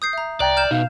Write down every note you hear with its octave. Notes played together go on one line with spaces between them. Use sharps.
D#6 G6 C7
E5 A#5
C2 D5 G5 A#5 F#6 A6
F6 G6 E7
B2 D#4 F5